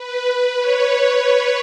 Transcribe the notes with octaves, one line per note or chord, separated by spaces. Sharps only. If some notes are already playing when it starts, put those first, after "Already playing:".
Already playing: B4
B4
C#5